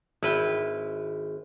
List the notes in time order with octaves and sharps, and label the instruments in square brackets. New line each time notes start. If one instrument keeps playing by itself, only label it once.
[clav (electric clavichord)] G#1 [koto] E4 B4 G5